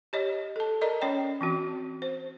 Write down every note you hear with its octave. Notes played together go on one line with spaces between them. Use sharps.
G4 C#5 D#5
A4 A5
A#4 D5 D#5 A#5
C#4 C#5 G5
E3 C4 F#4
C5